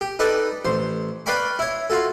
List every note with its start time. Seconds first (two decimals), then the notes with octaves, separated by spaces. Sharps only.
0.01 G4
0.19 D#4 A4 B4 D5
0.65 A1 C5
1.26 B4 D5 F5 G5 B5 C#6
1.59 E4 C#5
1.90 F4 F#4 A4